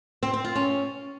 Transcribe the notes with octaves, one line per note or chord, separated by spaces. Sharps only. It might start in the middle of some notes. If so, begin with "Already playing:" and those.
C4
C4
F4
C#4